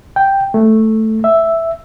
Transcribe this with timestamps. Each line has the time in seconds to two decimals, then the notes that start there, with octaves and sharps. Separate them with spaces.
0.16 G5
0.54 A3
1.24 E5